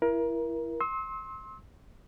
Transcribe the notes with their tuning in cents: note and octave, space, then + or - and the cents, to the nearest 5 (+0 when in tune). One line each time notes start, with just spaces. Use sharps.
E4 +20 A#4 +25
C6 +25 E6 -35